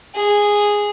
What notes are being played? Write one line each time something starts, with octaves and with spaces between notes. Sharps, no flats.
G#4